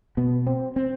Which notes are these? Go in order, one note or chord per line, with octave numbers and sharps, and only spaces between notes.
B2 B3
C4
C4